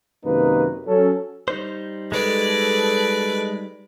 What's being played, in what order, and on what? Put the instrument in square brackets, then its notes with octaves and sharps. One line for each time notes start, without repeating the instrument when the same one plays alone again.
[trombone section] F#2 C3 D#3 A#3 D#4 B4
F#3 C#4 A4
[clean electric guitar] G3 D#4 C5
[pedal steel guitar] G#3 [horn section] A4 [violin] B4 D5